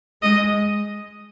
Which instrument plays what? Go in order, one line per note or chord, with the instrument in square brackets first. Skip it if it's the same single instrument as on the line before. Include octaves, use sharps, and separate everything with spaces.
[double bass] G#3 [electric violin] D#5